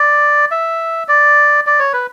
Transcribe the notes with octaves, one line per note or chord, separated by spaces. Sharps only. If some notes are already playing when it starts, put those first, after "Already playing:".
Already playing: D5
E5
D5
D5
C#5
B4